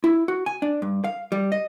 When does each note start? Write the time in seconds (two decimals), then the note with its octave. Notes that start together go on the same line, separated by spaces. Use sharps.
0.04 E4
0.28 F#4
0.46 G#5
0.62 D4
0.82 G2
1.04 F5
1.32 G3
1.52 D#5